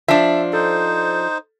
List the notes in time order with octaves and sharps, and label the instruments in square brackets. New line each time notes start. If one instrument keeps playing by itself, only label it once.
[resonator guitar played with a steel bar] F3 D4 [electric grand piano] E5 A5 E6
[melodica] D#4 C5 [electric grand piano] A4